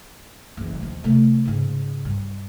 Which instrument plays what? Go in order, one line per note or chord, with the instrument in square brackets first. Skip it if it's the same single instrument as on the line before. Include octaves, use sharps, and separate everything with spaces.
[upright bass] F#1 E3
D#2 F3
C3 A3
G#2 C#3
G2